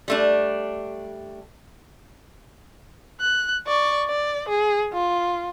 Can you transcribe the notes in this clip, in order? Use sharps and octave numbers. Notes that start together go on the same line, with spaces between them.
G3 A3 D4
F#6
D5 C#6
D5
G#4
F4